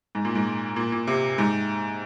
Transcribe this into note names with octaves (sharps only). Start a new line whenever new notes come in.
G#2
A#2
G#2
A#2
A#2
C3
G#2